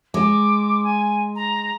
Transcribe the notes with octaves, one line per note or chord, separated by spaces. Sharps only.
G#3 D6
G#5
A#5